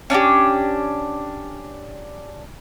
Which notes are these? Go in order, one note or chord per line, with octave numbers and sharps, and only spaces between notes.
C#4 D4 E4 G4